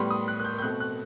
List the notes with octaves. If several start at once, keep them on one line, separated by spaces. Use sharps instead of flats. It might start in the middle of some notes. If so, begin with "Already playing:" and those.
Already playing: A2 G3 B3 C6
D#6
F#6
F#6
G6
G6
B2 A3 C4 F#6
F#6